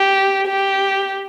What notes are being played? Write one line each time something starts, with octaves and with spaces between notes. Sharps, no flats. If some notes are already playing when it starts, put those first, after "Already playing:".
Already playing: G4
G4